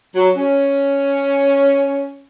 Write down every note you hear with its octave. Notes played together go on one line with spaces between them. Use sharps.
F#3
C#4